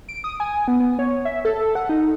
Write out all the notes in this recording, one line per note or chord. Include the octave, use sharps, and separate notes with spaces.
D7
D#6
G#5
B3
B3
C#5
E5
A4
F#5
D#4